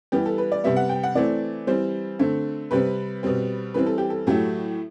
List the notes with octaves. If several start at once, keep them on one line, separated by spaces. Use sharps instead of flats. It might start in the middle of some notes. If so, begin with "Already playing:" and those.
E3 G3 B3 G4
A4
B4
D5
C3 G3 B3 E5
F#5
G5
F#5
E3 A3 C4 D5
E3 G3 C4 C5
D3 A3 C4
C3 G3 C4 B4
B2 G3 C4
E3 G3 C4 B4
A4
G4
A4
A2 F#3 A3 G4